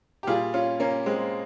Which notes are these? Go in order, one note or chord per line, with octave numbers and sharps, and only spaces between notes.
G4
A#2 G3 F4 G#4
C#4 F4
A#3 C#4
G#3 C4